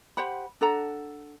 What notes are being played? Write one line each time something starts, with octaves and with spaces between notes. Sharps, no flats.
G4 C5 F#5 B5
D4 A4 F#5 A#5